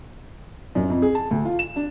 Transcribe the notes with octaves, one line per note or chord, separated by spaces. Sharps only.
F#2
F2
G#4
A5
D2
F4
E7
D4